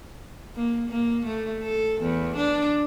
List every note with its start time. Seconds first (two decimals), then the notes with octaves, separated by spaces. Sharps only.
0.55 A#3
0.89 A#3
1.25 A3
1.61 A4
2.01 E2
2.36 D4